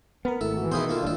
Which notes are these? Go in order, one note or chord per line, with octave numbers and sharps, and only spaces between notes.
B3 A#4 B5 F6
G#1 A3 E4 A4 A#4
E3 F#4
B2 D#3 E4 G#4 B4 C5 F5
A#3 F4 A4
D#1 D#2 A2 D4 A4